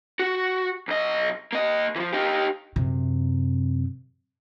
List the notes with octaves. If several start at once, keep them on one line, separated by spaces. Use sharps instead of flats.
F#4
B1 D#5
A#3 D#5
E3 F3
D#4 G4
F#2 C3